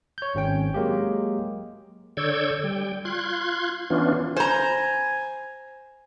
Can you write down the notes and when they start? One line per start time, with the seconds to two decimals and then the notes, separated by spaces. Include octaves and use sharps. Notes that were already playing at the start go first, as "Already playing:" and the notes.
0.18 C#5 G6
0.35 G#1 C4 C#4 G5
0.74 F#3 G#3 A#3 G4
2.17 D3 C#5 D5 E6 G6 G#6
2.64 G3 G5
3.05 F4 C6 F#6 G#6
3.90 E3 B3 C#4 D4 F4
4.37 C5 G#5 A#5